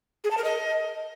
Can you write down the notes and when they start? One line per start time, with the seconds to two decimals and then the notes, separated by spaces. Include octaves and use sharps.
0.24 G#4
0.31 A5
0.38 A#4
0.44 D#5